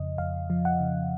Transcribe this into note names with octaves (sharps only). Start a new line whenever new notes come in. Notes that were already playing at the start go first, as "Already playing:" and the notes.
Already playing: F2 C#3 F3 D#5
F2 F5
F3
F#5
C#3